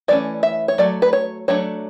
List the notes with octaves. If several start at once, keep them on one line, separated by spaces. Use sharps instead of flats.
E3 A3 C#4 D5
E5
C#5
F#3 A3 D5
B4
C#5
F#3 A3 D4 C#5